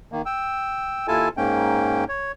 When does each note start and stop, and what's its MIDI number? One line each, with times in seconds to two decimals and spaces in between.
0.12 0.22 51
0.12 0.22 58
0.26 1.07 79
0.26 1.07 88
1.08 1.29 39
1.08 1.29 64
1.08 1.29 65
1.08 1.29 69
1.08 1.29 80
1.08 1.29 81
1.37 2.04 44
1.37 2.04 58
1.37 2.04 61
1.37 2.04 79
2.09 2.32 73